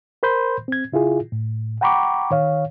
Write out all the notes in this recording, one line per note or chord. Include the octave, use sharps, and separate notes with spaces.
A#4 C5 B5 C6 G6
C4 G#6
C#3 E4 F4 G#4
A2
F#5 G5 A#5 B5 C#6 D6
D#3 C#5 F5